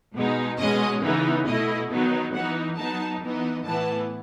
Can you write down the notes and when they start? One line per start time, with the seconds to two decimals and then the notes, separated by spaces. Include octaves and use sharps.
0.16 B2 G#3 D#4
0.59 B2 G#3 C#4 D#5
1.03 C#3 E3 B3 D#4
1.47 B2 A3 E4 D#5
1.91 D#3 F#3 B3 D#4
2.34 E3 B3 D#4 F#5
2.78 F#3 B3 D#4 A5
3.21 E3 B3 D#4
3.65 A2 E3 B3 A5